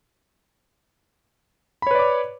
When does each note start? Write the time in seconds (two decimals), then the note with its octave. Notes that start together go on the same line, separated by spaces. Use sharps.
1.82 B5
1.87 C#5
1.91 B4
1.95 D5
1.99 D6